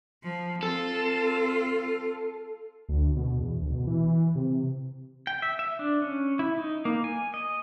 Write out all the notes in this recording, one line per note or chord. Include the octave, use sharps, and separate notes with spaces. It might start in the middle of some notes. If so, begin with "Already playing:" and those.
F3
C4 F4 A4
D2
B2
E2
D2
B2
E3
C3
G5
E5
E5
D4
C#4
E4
D#4
A#3
G#5
D#5